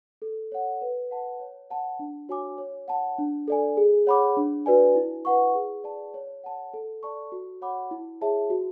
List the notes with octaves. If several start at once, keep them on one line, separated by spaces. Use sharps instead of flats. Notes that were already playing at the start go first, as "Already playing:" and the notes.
A4
C#5 F#5
B4
F#5 A5
C#5
F#5 A5
D4
F#4 C#5 G#5 D6
C#5
F#5 A5
D4
A4 D5 G#5
G#4
C#5 F#5 B5 D6
D4
F#4 B4 D5 G#5
E4
B4 F#5 C#6
G#4
D5 A5
C#5
F#5 A5
A4
D5 A5 C#6
F#4
C#5 F#5 B5 D6
E4
G#4 C#5 E5 A5
F#4